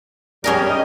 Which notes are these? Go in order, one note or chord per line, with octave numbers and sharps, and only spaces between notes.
D#3 G3 C#4 G#4 A#4
D#5